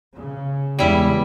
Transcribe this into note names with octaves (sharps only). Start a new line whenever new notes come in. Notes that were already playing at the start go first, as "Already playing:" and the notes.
C#3
E2 C#3 G3 G#3 B3 E4